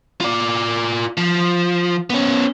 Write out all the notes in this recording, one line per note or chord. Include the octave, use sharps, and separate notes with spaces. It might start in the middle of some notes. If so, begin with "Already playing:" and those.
F4 D5
F3
B3 C#4